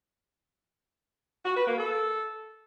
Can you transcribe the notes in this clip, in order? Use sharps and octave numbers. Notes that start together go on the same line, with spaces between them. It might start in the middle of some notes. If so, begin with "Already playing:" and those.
F#4
B4
A#3
A4